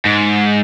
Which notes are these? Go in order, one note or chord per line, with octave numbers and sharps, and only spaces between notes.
G#2